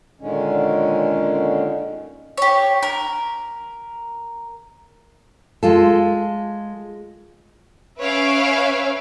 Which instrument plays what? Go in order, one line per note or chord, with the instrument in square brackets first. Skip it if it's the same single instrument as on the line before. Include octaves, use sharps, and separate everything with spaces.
[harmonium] A#2 D3 D#3 G#3 C#4
[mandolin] G4 C#5
A#4
[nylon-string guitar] G#3 F4 A4
[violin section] C#4 B4 C#5 E5 F5 D7